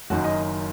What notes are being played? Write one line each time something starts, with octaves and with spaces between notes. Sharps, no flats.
F#1 F#2 D#3 F#4
D#5